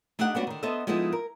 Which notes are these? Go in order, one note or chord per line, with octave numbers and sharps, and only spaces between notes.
A3 D4 D#4 G4 F#5
G3 A3 B3 C#4 D4 F#4
D3 D#3
B3 A4 C5 D#5 E5
F3 G#3 A3 B3 D#4 E4
A#4